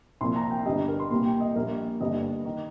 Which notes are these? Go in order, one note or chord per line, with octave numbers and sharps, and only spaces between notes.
C2 A#2 F3 C6
A#5
G5
G1 G2 G3 D#5
A#4
C6
C2 A#2 G3 A#3 C6
G5
D#5
A#1 A#2 G3 A#3 A#4
G1 G2 G3 A#3 D#5
D#3